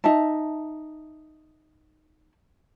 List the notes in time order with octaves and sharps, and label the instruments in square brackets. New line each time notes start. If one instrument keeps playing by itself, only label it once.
[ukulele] D#4 E5 A5